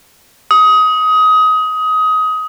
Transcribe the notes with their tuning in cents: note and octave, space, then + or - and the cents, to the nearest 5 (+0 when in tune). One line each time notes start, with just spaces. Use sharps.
D#6 +20